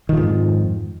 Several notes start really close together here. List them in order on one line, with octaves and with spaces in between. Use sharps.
D#3 F3 G#2 F2